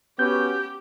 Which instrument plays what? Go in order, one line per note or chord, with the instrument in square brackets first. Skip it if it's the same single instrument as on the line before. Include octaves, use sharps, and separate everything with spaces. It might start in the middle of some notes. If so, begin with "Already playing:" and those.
[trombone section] B3 C#4 F#4 [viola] G4 [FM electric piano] G6